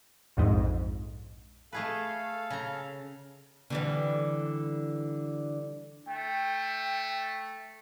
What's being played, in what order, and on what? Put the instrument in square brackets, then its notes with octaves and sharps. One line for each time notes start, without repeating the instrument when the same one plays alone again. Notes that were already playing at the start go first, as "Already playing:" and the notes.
[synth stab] A#1 F2 G#2
[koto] A3 G#4 B4 [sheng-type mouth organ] A4 F5
[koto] C#3 A#5
[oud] D3 E3 G3
[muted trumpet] A3 [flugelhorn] G5